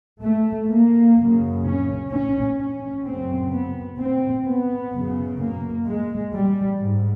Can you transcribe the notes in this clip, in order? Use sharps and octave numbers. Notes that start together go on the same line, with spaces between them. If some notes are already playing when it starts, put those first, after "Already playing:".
A3
A#3
F#2 C#3
C#4
C#4
C#4
F#2 C#3 C4
B3
C4
B3
F#2 C#3
A#3
G#3
G3
G#2